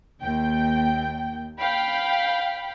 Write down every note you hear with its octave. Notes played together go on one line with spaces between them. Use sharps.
D#2 G5
F5 G5 B5